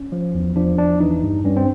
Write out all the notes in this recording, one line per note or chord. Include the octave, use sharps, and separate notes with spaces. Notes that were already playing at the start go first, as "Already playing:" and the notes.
Already playing: C#4
F3
E2
F3 D4
E2 D4
E3 D#4
G2
G2 C#4
C4